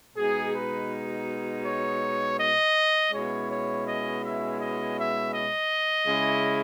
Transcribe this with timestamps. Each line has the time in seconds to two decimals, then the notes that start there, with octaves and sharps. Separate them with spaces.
0.15 B2 G#3 D#4 G#4
0.52 B4
1.63 C#5
2.37 D#5
3.11 B2 G#3 C#4 E4 C#5
3.48 C#5
3.85 D#5
4.22 E5
4.58 D#5
4.96 E5
5.32 D#5
6.06 C#3 G#3 C#4 E4